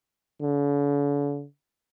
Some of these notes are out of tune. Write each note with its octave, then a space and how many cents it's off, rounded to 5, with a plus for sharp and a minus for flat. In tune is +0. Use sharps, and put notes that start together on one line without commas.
D3 -45